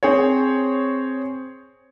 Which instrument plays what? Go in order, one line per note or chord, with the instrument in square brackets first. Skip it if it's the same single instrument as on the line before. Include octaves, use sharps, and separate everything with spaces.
[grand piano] C4 G#4 C5 C#5